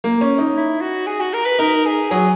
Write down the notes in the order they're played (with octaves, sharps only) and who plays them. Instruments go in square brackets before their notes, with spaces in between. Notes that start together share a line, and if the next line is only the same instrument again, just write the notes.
[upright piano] A#3
C#4
D#4
[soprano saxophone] E4
F#4
G#4
F#4
A#4
B4
[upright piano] D#4 [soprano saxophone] A#4
[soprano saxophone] G#4
[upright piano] F#3 [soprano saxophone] G#4